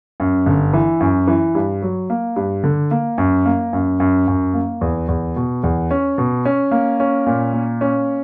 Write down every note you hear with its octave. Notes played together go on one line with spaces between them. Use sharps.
F#2
G1
E3
F#2
E3
G2
F#3
A#3
G2
D3
A#3
F#2
A#3
F#2
F#2
F#2
A#3
E2
E2
B2
E2
C#4
B2
C#4
A#3
C#4
A#2
A#3
C#4